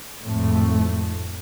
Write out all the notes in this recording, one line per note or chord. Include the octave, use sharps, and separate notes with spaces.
G#1 F2 A2 A3